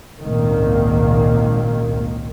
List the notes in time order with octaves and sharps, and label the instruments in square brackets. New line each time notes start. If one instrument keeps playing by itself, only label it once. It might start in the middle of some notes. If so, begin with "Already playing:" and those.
[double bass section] G#1 C#2 A#2 D#3 A#3